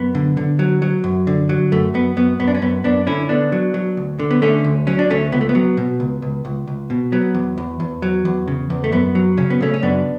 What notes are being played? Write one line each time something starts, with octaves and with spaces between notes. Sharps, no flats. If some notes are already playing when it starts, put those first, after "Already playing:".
Already playing: F#2 B3
D3
D3
F#3
F#3
F#2
D3
F#3
F#2 A3
F#2 B3
F#2 B3
F#2 B3
D4
C#4
F#2 B3
F#2 B3 D4
D3 C#4 E4
D3 B3 D4
F#3
F#3
D2
D3
B3
D3 A3 C#4
D2
F#3 C#4
D4
D2 A3 C#4
C#2 B3
A3
B3
F#3
B2
C#2
C#2
C#2
C#2
B2
F#3 B3
E2
E2
E2
F#3
E2
C#3
E2
A3
F#2 B3
F#3
C#3 C#4
B3
C#3 A3 C#4
C#4
F#2 B3 D4